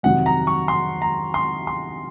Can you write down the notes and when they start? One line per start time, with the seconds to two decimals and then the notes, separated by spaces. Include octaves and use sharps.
0.03 F2 C3 D#3 F#3 F#5
0.26 A#5
0.47 C#6
0.68 C6
1.02 A#5
1.34 C6
1.67 C6